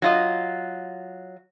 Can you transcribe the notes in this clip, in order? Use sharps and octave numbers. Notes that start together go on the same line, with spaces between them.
F#3 F4 D#5